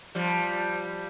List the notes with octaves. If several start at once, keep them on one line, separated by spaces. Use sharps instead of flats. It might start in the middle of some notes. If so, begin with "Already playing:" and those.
F3 G3